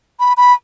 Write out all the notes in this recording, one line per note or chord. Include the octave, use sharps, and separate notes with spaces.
B5
B5